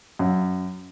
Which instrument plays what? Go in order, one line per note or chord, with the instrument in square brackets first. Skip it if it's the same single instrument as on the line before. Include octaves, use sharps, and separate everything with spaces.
[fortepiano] F#2